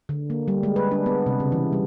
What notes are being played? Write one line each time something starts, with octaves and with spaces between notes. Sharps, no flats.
D3
A#3
G3
G#3
B4
D4
B3
C3
C#3
E3
G3